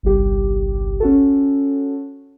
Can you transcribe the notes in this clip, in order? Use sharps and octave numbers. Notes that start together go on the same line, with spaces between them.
G1 C2 G4
C#4 F#4 A4